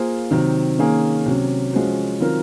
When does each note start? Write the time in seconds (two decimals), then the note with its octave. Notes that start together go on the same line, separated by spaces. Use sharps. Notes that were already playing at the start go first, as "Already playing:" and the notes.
Already playing: A#3 F4 G#4 C5
0.31 C3 D#3 F#3 C4
0.79 D#3 A#3 C#4 G#4
1.26 C3 F#3 C#4
1.73 F3 G#3 C#4 F#4 C5
2.20 D#3 F#3 C4 F4 A#4